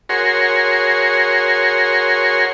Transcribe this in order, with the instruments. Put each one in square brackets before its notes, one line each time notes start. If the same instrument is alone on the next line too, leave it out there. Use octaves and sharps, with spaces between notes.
[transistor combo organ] F#4 G#4 A#4 C#5 C6